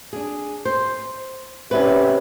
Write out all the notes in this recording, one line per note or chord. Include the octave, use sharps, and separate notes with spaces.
D4 G#4
C5
C3 C#4 E4 B4